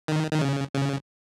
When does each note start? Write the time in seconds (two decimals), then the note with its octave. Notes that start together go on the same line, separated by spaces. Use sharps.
0.08 D#3
0.31 D#3
0.41 C#3
0.74 C#3